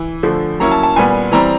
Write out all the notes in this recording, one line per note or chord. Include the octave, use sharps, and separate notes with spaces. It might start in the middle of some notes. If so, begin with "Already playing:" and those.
Already playing: E3
D3 F3 A3
F#3 A#3 C#4 E4 A#5
A5
A5
A#2 G3 B3 G#5
E3 G3 C4 A#5